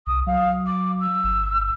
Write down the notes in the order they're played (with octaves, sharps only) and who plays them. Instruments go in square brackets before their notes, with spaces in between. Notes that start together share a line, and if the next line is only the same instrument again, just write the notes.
[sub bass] C2 [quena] D#6
[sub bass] F#3 [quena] F5
[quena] D6
E6
[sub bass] G1